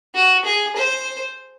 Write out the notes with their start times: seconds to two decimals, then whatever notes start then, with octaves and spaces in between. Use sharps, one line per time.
0.14 F#4
0.45 G#4
0.76 C5